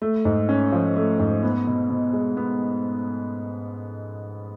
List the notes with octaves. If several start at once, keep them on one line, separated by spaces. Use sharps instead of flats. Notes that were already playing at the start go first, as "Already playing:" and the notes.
A3
G#2
C#4
F3
A3
G#2
B3
B2
B2
G#3
B3